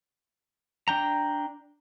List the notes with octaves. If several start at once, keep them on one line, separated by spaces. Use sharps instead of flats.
D4 G5 A#5